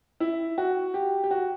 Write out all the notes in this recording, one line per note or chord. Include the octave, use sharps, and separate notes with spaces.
E4
F#4
G4
G4
F#4